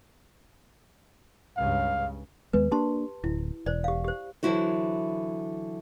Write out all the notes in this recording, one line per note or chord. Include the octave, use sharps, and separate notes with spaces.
C#2 G2 C#3 F5
D#2 G#3 B3 B4
A#3 D4 G4 A5 C6
D1 E4
E1 C5 D5
G4 F5
G4 C5
D3 E3 F#3 E4 F#4 C5